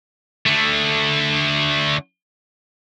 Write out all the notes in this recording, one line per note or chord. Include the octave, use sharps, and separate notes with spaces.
D3 A3